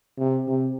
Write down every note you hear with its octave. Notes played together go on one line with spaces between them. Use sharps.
C3
C3